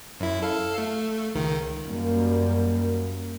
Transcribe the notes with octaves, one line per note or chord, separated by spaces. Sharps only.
F#2 E4
A4 F5
A3
C#2 D#3
F#2 G3 A#3